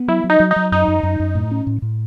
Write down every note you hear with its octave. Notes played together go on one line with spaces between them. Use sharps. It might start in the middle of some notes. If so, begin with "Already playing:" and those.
Already playing: B3
F#3 E4
F#3
D#4
F#3
D#4
F#3
F#2 D#4
F#2
F#2
F#2
A2
C#4
A2
A2